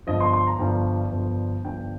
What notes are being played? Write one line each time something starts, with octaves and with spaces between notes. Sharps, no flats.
G1 G2 F3 D#5
C6
C6
A#5
G1 G2 F3 G5
G1 G2 F3
G1 G2 F3 G5